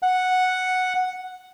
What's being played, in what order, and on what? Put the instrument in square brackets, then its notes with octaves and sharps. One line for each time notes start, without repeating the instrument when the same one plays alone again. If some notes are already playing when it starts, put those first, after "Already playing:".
[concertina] F#5